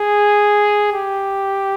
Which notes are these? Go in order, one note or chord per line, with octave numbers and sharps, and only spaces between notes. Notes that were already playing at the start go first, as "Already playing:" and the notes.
Already playing: G#4
G4